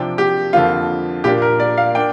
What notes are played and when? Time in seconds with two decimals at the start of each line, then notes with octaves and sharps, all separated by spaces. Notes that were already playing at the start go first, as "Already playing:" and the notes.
Already playing: C3 F3 D4 G5
0.18 G4
0.53 F2 D3 F3 A#3 F4
1.24 A#2 A#3 D4 G4
1.42 A#4
1.60 D5
1.78 F5
1.95 A#3 D4 G5